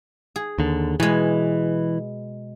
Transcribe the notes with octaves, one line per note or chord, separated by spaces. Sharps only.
G#4
D#2 D3
B2 E3 G#3